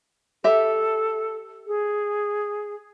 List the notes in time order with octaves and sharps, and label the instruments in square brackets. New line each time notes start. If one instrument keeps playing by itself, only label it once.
[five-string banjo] G4 E5 [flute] A4
[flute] G#4